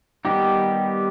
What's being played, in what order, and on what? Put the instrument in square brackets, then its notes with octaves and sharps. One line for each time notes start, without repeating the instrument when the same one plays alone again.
[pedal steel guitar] D#3 G3 B3 D#4 G4